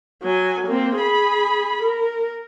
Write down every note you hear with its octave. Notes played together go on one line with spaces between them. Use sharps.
F#3 G#5
A#3 C4
G#4 B5
A#4